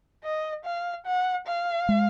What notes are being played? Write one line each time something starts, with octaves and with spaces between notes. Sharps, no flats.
D#5
F5
F#5
F5
G#3